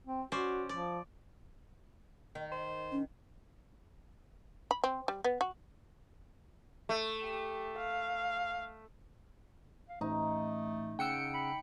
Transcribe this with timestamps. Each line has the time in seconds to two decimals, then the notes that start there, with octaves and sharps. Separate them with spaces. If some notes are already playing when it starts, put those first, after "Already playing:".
0.07 C4
0.32 C#4 F#4 C5 D5
0.69 F3 D5
2.35 D#3
2.52 C5
2.92 C#4
4.71 B5
4.84 C4
5.08 G3
5.24 B3
5.41 F#4
6.89 A3
7.24 G4
7.78 F5
9.89 F5
10.01 A1 A3 D#4
10.99 C#3 F#5 G5 E6 C#7 D7
11.34 B5